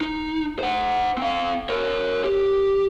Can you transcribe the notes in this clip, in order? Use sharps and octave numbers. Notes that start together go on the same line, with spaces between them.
D#4
C5 F#5
C4 F5
A#4 C#5
G4